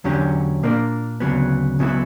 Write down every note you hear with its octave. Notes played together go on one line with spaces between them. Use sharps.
E2 D3 F#3 C#4 G4
A#2 A#3 D4 A#4 D5
D2 C#3 F#3 B3
C#2 C#3 F#3 B3 E4